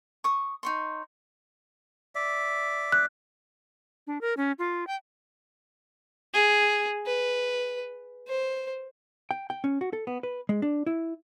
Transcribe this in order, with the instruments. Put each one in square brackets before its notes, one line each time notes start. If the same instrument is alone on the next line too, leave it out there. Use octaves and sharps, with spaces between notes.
[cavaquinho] C#6 D#6
D#4 C#5 C6
[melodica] D5 E5
[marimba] F#6
[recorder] D4
A#4
C#4
F4
G5
[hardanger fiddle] G#4
B4
C5
[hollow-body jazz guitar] G5
G5
C#4
F#4
A4
B3
B4
G#3
D4
E4